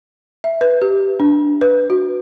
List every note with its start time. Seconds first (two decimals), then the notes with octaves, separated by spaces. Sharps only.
0.44 E5
0.61 B4
0.82 G4
1.20 D4
1.61 B4
1.90 F#4